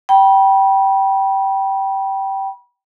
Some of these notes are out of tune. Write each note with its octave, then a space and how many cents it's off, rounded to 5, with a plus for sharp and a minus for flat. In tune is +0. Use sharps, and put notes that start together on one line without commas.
G5 -15 B5 -30